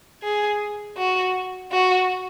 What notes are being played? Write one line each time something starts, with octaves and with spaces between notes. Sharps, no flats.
G#4
F#4
F#4